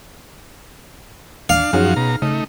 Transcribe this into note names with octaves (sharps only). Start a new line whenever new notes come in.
D#2 D4 F5
F#2 F3 C#4 D#4 F#4 G#4
B2 A#5
C#3 A3 D#4